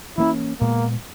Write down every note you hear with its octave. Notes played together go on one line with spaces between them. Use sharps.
E3 A#3 C#4 E4
A#2 G#3 A#3 B3